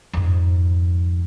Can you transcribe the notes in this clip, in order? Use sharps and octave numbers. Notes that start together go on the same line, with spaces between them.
F2 G#2